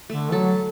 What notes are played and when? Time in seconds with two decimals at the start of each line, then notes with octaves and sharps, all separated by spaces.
0.09 D3 A3
0.32 F#3 A4